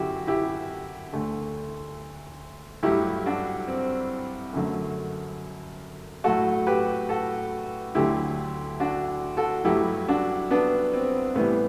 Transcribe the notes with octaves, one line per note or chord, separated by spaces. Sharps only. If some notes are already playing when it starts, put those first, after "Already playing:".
Already playing: F#2 D3 F#3 E4 F#4 G4
E4 G4
D2 D3 A3
G2 F#3 A3 E4 G4
D4 F#4
C4
F#2 D3 F#3 A3
A2 F#3 A3 F#4 A4
G4 B4
F#4 A4
D2 D3 F#3 A3 E4 G4
D4 F#4
F#4 A4
G2 F#3 A3 E4 G4
D4 F#4
B3 D4
C4
A2 E3 G3 B3